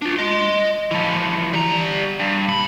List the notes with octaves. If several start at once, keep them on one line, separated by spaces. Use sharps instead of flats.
D4 F4
D#5 C6
E3 F3
G3 A#5
G2
A#2 B5